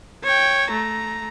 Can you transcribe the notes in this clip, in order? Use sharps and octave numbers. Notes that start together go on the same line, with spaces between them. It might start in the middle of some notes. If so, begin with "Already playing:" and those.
C#5 G5
A3 A#5